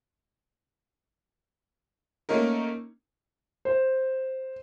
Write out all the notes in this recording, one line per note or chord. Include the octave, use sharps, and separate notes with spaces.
A3 A#3 C#4 D#4 A#4
C5